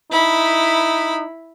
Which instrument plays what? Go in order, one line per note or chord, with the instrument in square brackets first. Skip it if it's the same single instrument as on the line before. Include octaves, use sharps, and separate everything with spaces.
[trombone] D#4 [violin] E4 B5